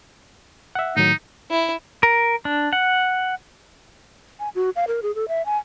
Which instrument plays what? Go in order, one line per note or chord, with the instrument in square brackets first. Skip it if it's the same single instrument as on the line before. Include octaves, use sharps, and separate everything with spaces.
[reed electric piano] E5 F#5
[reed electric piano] A2 D#3 F#3 [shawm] D#4
[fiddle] E4
[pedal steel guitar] A#4
D4
F#5
[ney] G#5
F#4
F5
A#4
G#4
A4
E5
G#5